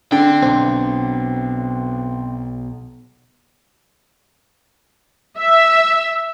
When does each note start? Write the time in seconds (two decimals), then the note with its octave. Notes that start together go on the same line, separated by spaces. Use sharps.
0.12 D3 C4 G5
0.43 B1 C4
5.38 E5